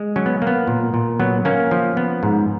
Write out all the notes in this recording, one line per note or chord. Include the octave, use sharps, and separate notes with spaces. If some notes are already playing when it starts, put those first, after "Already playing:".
Already playing: G#3
F#3 C#4
B3
A#3
B3
A#2
A#2
F#3 B3
A#3 C#4
F3
B3
G#2